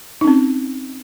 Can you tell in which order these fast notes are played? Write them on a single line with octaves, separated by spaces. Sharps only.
D#4 C#4 C4